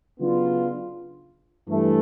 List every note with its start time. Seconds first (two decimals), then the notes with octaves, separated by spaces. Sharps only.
0.18 C#3 F#3 B3 D4 F4
1.69 G2 E3 A3